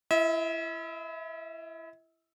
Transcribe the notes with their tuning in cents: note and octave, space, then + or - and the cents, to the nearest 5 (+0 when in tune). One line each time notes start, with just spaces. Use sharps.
E4 +25 E5 -40